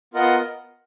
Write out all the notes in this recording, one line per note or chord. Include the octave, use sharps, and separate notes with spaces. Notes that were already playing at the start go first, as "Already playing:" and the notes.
B3 F4 A#4 D#5 F#5